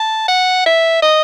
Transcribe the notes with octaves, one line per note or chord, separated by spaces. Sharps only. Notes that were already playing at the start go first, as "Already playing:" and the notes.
Already playing: A5
F#5
E5
D#5